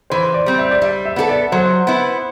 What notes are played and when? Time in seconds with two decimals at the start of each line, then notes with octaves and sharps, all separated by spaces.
0.10 E3 C5
0.34 D5
0.46 G3 C4
0.58 E5
0.71 D5
0.82 G3 E5
1.05 E5
1.16 B3 F#4 A4
1.29 D5
1.52 F#3 C5
1.87 B3 E4